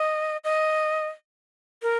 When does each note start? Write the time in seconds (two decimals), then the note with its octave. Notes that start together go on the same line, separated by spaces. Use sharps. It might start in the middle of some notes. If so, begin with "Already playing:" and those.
Already playing: D#5
0.44 D#5
1.82 A#4